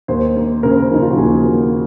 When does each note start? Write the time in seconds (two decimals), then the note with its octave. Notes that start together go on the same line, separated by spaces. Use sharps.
0.08 D#2 C5
0.36 A#3
0.63 C#3 A#4
0.71 C5
0.80 A#4
0.91 F3 D#4
1.02 F4
1.10 F#4
1.17 D#2 G#4
1.46 A#3